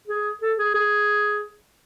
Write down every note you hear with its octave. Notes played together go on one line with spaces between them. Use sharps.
G#4
A4
G#4
G#4